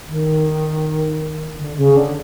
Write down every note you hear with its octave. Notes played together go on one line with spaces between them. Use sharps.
D#3
D3
C#3
D3